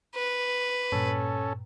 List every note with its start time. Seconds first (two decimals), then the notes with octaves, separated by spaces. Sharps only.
0.15 B4
0.92 G2 A#2 C#4 A4